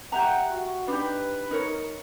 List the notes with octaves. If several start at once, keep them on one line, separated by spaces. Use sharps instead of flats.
G4 E5 F#5 A#5
F#4
D4 D#4 G4 B4
D#4 A#4 C#5